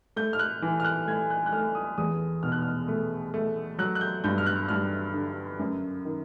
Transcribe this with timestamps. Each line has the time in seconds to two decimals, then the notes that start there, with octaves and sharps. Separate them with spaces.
0.16 A3 G6
0.33 F6
0.39 F#6
0.62 E3
0.80 F6
0.85 F#6
1.07 A3 G#6
1.30 F#6
1.46 F#6
1.52 A3 F6
1.75 D#6
1.98 E2 D#6
2.43 B2 F6
2.52 F#6
2.62 F6
2.88 A3
3.34 A3
3.79 F#3 F#6
3.95 F#6
4.01 G6
4.24 G2 G6
4.38 F6
4.46 F#6
4.68 G2 F6
5.14 D3
5.59 F#2
6.05 D#3